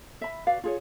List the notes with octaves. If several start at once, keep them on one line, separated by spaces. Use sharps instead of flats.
E5 B5
F#4 B4 D5 F5
F4 G#4 C#5